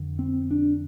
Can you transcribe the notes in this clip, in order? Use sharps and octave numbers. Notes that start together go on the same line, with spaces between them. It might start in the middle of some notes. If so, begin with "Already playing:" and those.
Already playing: F2 D3
C4
D4